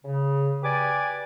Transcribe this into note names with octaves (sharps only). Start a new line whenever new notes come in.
C#3
G4 B4 D5 G#5 D6